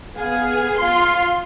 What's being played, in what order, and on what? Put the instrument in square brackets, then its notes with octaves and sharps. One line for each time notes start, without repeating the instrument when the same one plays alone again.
[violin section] B3 G#4 [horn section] F5
[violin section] F4 C6